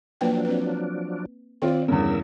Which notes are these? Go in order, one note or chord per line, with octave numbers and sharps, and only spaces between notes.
F3 F#3 A#3 D4 B4 G5
C4 B4
D#3 C4 F4 D5 G5
E2 G2 C#3 A#4 E6